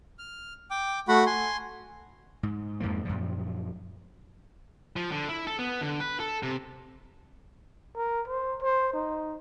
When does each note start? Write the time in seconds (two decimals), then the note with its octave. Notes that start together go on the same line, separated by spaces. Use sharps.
0.19 F6
0.71 G5 D6
1.08 A3 F#4 F#5 B5
1.26 G#5 C6
2.43 G#2
2.80 F2 G#2 F3 A#3
3.05 F#2 A#2 F3
4.96 F3
5.12 D3
5.29 E4
5.47 A4
5.59 B3
5.81 D3
6.00 B4
6.20 A4
6.43 C3
7.96 A#4
8.28 C5
8.62 C5
8.94 D#4